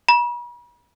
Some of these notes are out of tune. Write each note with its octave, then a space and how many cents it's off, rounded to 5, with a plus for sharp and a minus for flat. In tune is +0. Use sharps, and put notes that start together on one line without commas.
B5 -45